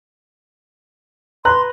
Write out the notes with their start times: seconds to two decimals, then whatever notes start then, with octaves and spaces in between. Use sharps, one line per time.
1.45 B4 A#5 C6 F#6